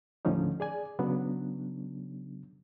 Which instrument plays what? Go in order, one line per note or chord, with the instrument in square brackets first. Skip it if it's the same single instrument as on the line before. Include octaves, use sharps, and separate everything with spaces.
[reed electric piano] D#2 A2 D3 F3 C#4 D#4
G#4 D5 G#5
C#3 F#3 B3 D4